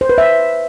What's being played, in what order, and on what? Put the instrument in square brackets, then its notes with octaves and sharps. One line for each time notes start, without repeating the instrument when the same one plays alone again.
[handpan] C5
B4
E5